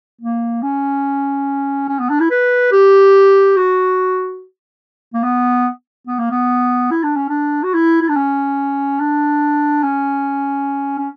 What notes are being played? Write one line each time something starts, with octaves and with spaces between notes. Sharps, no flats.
A#3
C#4
C#4
B3
D4
E4
B4
G4
F#4
A#3
B3
B3
A#3
B3
E4
D4
C#4
D4
F#4
E4
E4
D4
C#4
D4
C#4
C#4